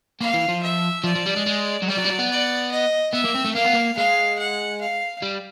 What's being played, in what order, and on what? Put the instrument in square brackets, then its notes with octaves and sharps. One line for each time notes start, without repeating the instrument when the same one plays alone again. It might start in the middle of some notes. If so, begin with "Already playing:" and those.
[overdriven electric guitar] A#3 [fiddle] F5
[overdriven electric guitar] E3
F3
[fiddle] E5
[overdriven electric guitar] F3 [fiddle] D5
[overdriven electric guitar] F3
G3
G#3
G#3
F#3
[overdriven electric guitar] G3 [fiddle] D5
[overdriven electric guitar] F#3
G3
F#3
B3
[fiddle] D5
D#5
[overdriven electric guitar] B3 [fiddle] E5
[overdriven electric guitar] A#3
C4
A3
[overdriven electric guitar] A#3 [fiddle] F5
[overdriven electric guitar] B3
A#3
[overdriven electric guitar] G#3 [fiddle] F5
[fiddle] F#5
F5
[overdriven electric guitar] G3